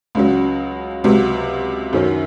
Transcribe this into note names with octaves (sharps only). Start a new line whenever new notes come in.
C#2 C#3 F#3
C#2 C3 F#3
F#2 D#3 F#3 C#4